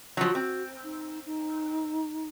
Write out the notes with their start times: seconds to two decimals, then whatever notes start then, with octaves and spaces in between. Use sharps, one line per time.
0.17 F3 F#3 F#4
0.35 C4
0.84 D#4
1.26 D#4